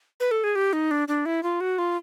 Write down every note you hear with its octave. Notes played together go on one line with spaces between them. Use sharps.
B4
A4
G#4
G4
D#4
D4
D4
E4
F4
F#4
F4